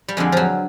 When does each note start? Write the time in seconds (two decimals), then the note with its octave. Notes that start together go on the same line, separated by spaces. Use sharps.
0.08 G3
0.17 F2 D3 G#3
0.32 F3 F#3